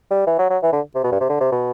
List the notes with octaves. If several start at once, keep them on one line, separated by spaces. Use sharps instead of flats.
G3
E3
F#3
F#3
E3
D3
C3
B2
G2
C3
D3
C3
B2